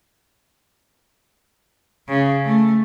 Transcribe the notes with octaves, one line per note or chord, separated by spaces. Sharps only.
C#3
A3